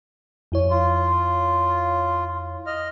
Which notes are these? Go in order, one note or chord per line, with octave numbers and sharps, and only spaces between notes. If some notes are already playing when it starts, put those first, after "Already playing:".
F2 E4 C#5
F4
D#5 F6